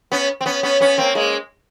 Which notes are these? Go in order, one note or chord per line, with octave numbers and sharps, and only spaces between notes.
B3 C#4
C4
B3 C#4
B3 C#4
B3 C#4
A#3 C4
G#3 A#3